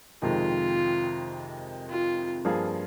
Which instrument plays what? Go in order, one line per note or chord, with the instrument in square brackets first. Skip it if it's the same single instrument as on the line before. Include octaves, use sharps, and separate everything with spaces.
[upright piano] F2 C3 D#3 G#3 [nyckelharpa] F4
[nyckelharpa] F4
[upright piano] G2 F3 A#3 F4 G#4